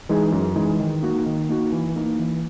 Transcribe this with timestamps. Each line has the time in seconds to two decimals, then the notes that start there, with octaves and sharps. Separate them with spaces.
0.09 E3 G#3 D#4 G#4
0.32 F#2
0.56 E3 G#3 D#4 G#4
0.80 D#3
1.03 A#3 D#4 F#4
1.26 D#3
1.49 A#3 D#4 F#4
1.72 E3
1.96 A#3 D#4
2.19 E3